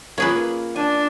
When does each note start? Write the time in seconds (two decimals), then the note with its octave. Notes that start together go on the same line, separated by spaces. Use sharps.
0.18 A#3 C#4 F4 G#4 B4
0.76 D4 G#5